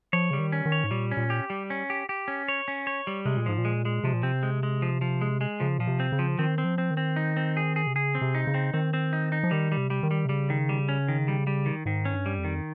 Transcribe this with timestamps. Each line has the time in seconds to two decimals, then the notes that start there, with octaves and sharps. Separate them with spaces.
0.13 F3 C#5
0.31 C#3 G3
0.39 D#3
0.52 C#4
0.66 D#3
0.72 C#5
0.84 G#2
0.91 A#2 G3
1.11 C#4
1.17 A#2
1.30 G4
1.50 G3
1.70 C#4
1.90 G4
2.09 G4
2.28 C#4
2.48 C#5
2.68 C#4
2.87 C#5
3.07 G3
3.25 C3 G#3
3.37 A#2
3.46 G#2 F3
3.58 A#2
3.65 G#3
3.85 G#3
4.04 C3 F3
4.13 A#2
4.23 C3 C4
4.43 G#3
4.63 G#3
4.82 F3
5.01 F3
5.21 G#3
5.41 G#3
5.60 C#3 F3
5.79 A#2 F3
5.87 C3
6.00 C4
6.12 C#3
6.19 F3
6.39 D#3 C4
6.58 C4
6.64 F3
6.78 C4
6.91 D#3
6.97 C4
7.16 D#4
7.37 C4
7.57 G#4
7.76 G#4
7.87 C3
7.95 C#3 G#4
8.15 C4
8.21 C3
8.35 D#4
8.47 C#3
8.54 C4
8.74 D#3 C4
8.94 C4
9.13 D#4
9.32 D#4
9.44 F3
9.51 D#3 G3
9.72 G3
9.77 C3
9.90 G3
10.03 D#3
10.11 G3
10.25 C3
10.29 C#3 G3
10.50 D#3
10.69 G3
10.89 C#4
11.08 D#3
11.28 G3
11.47 G3
11.66 D#3
11.86 G#2 D#3
12.05 C#4
12.12 G2
12.26 G3
12.38 F2
12.45 D#3